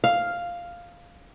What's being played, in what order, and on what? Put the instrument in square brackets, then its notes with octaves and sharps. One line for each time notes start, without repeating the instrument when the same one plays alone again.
[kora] F5